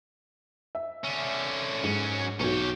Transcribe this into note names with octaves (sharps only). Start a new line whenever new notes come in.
E5
D3 C#4
G#2 F#3 C#4
B1 C#4 F#4 G4